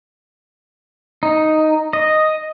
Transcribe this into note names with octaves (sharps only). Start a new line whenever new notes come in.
D#4
D#5